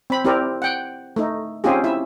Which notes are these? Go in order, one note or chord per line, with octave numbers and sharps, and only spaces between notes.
C4 B5
C4 E4 G4 A#4 D5
F#5 G5
A3 D#4
C4 C#4 D#4 F4 G4 G#4
E4 E5